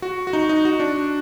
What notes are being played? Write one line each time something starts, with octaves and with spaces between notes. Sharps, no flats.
F#4
F#4
D#4
D#4
F#4
D4